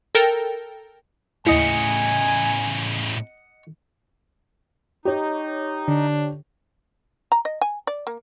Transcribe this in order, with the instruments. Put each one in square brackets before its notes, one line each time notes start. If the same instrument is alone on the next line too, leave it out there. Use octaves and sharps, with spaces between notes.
[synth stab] A4 A#4 G5
[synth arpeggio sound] D#2 E4 [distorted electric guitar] A2 C#3 [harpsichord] D#5 F#5 [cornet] G#5
[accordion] D#4 [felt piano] G4 C#5
[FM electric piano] D3 [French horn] D4
[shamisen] A#5
D#5
G#5
D5
A#3